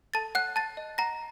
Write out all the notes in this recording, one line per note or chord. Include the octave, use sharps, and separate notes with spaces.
A4 A5 A6
C#5 F#5 F#6
F#5 A5 A6
D#5
F#5 A#5 A#6